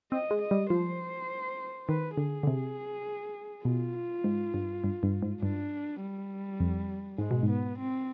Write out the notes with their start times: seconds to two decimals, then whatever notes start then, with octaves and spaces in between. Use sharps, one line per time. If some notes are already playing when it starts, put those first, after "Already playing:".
0.11 C4 D#5
0.31 G#3
0.41 D#5
0.51 G3
0.70 F3 C5
1.88 D#3 B4
2.18 D3 G#4
2.43 D3
2.47 C3
3.65 B2 F4
4.24 G#2
4.54 G2
4.84 G2
5.03 G2
5.22 G#2
5.41 G2 D4
6.01 G3
6.60 F2
7.18 G#2 G#3
7.31 B2
7.43 G#2
7.49 B3
7.78 C4